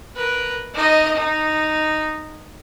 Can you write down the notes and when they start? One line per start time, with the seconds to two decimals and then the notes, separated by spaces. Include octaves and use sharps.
0.15 A#4 B4
0.74 D#4 D#5
1.15 D#4